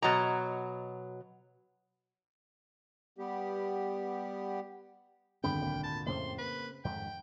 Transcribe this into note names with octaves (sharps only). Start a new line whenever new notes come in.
B2 F#3 D#5 A#5
G3 B3 G4
G#1 D2 G3 B3 G5 B5
B1 A#3
A#2 A5
F2 A2 C#3 A#3 C4 C6
A#3 B4
F2 G#2 D#3 G5